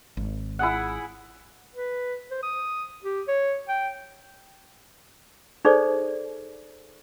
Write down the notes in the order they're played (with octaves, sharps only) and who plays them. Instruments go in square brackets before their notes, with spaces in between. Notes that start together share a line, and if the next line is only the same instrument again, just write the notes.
[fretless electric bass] G#1
[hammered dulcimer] E4 G#4 F#5
[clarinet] B4
C5
D#6
G4
C#5
G5
[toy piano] D#4 G#4 A4 C5 D5